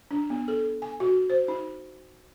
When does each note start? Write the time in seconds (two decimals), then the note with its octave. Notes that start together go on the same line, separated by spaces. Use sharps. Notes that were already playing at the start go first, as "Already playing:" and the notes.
0.11 D4
0.30 B3
0.48 A4
0.82 G#5
1.00 F#4
1.30 C5
1.48 D#4